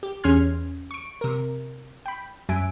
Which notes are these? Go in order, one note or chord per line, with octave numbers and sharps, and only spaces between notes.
G4
E2 C#4 G#4 C6 F6 G#6
C#6 D7
C3 A#4
G5 B5
F#2 F#3 E5 G#5 D7